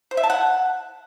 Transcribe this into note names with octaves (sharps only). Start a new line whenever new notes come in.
C5
E5
A5
F#5